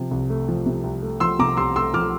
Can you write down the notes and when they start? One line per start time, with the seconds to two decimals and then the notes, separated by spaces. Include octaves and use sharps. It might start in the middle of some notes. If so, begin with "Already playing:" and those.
Already playing: C3 F3
0.11 C2
0.30 A3
0.49 F3
0.66 C3
0.84 C2
1.02 A3
1.20 F3 C6 E6
1.39 C3 A#5 D6
1.57 C2 C6 E6
1.76 A3 C6 E6
1.94 F3 D6 F6